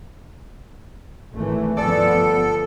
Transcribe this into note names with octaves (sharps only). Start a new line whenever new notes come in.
G#1 E3 A3
G1 F3 B3 A4 D5